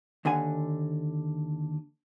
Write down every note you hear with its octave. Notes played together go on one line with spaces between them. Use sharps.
D#2 D3 F#5 G#5